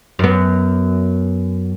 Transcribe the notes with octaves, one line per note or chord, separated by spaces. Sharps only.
F#2 B3